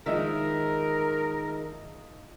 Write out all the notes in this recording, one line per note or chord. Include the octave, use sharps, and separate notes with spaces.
D#3 F3 G#3 D#4 A#4 E5